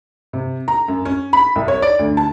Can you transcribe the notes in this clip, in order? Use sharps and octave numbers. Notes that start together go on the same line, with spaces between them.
C3
A#5
F#2
C#4
B5
C2
C#5
D5
D2
A5